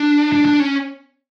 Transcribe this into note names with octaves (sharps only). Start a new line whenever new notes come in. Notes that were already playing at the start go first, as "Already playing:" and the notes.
Already playing: D4
D4
D4
C#4